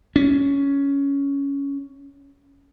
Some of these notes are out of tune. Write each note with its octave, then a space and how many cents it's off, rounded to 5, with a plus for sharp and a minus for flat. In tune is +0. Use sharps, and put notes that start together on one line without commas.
C#4 +10